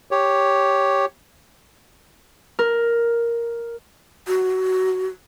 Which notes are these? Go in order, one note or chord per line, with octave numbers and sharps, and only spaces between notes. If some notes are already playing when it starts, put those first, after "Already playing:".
G4 C#5
A#4
F#4